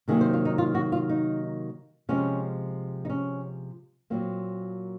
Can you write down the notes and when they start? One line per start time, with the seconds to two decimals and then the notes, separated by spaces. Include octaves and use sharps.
0.08 C3 D#3 F#3 A#3 G#4
0.21 C5
0.33 F4
0.45 D#4
0.58 F4
0.75 F#4
0.92 F4
1.09 D#4
2.09 C3 F3 G#3 C#4
3.05 D#4
3.10 C#4
4.10 A#2 F#3 A#3 C4